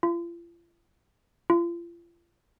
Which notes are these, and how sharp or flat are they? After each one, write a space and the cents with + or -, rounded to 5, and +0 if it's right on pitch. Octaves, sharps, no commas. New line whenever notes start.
F4 -40
F4 -35